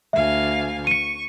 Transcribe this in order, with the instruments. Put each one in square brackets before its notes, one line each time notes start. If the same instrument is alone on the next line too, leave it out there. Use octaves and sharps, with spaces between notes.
[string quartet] D2 F5 G#5 [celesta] E5
[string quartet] C#6 [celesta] C#7 D#7